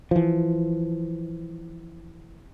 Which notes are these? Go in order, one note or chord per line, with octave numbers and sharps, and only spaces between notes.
E3 F3